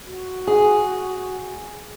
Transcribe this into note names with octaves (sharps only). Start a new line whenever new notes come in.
F#4
G#4